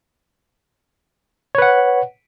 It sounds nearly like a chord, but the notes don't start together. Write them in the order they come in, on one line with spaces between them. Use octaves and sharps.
C#5 B4 F#5